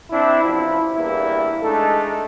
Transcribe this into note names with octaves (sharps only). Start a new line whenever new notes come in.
C4 D4 E4
A1 F3 E4
E2 G2 A#3 E4
G#3 A3 D4 D#4 A4